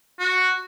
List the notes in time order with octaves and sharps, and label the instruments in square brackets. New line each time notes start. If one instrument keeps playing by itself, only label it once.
[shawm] F#4